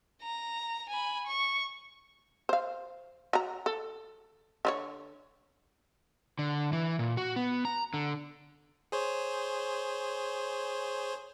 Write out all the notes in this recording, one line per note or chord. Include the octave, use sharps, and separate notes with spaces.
A#5
G#5 B5
C#6
C5 F5
F#3 A#5
A4
D3 D#4 C#5
D3
E3
A#2
F#4
B3
A#5
D3
G#4 C5 C#5